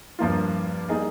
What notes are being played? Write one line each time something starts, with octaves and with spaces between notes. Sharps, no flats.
G2 F3 A#3 F4
G3 A#3 D#4 G#4 D#5